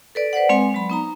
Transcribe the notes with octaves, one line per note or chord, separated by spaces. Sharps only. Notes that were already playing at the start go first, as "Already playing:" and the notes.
A4 B4 D5
B4 C5 D5 F#5
G#3 C4 G#5 C6
F#3 B5
B3 D#4 A#5